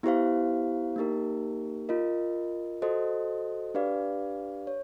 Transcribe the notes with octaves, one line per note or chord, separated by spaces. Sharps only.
B3 E4 G4 C5 F5
A#3 D#4 G4 A#4
F4 A#4 D#5
F#4 A4 C5 D#5
D4 G4 B4 D5 F5
C#5